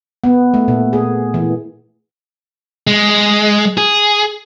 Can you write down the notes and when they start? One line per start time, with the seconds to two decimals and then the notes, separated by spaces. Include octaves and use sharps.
0.24 B3
0.54 A3
0.68 A#2
0.93 G#4
1.34 E3
2.87 G#3
3.78 G#4